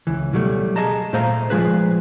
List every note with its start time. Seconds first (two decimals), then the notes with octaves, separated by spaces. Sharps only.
0.07 C#2 E3
0.33 B2 F#3 G3 A3
0.76 G#4 D#5 A5 A#5
1.13 A#2 A3 C5 F5 A#5 C6
1.50 F3 G#3 F4 G#4 B4 C5